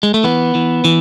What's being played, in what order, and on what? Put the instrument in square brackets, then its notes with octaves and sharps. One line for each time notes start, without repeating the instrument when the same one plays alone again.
[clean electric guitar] G#3
A3
E3 B3
E3
E3